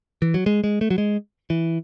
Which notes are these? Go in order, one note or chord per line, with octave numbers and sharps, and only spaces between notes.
E3
F#3
G#3
G#3
A3
F#3
G#3
E3